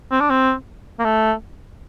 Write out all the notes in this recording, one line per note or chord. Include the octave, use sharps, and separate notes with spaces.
C4
D4
C4
A#3
A3